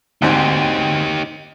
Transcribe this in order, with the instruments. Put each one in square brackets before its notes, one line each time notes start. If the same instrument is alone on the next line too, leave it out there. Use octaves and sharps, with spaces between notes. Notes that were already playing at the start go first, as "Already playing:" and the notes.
[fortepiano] D2 G#2 C4 [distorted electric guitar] D#4 G4